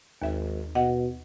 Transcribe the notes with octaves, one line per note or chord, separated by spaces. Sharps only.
G#1 D#2 E5
B2 D#5 F#5